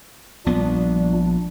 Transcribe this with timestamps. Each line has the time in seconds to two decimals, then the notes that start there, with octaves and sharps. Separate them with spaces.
0.46 A#1 A#2 G3 B3 D4